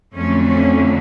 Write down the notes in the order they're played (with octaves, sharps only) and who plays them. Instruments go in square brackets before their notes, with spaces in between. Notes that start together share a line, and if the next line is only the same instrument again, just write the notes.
[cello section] F2 D3 F#3 A3 C#4
C#4